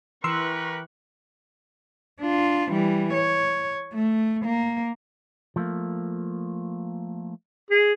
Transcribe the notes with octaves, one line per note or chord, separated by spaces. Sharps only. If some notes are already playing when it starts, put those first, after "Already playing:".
E3 G4 A#4 B4 C6 C#6 E6 F#6
D4 F4
E3 G3
C#5
A3
A#3
F3 A3 A#3
G#4